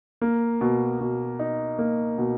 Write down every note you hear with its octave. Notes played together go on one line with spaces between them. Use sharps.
A#3
B2
B2
D#4
A#3
B2